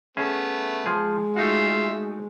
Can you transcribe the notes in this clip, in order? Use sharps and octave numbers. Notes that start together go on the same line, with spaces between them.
A3 B3 C#4 G#4 E5
F3 G#3 G#4
A3 D#4 F4 F#4 E5 F5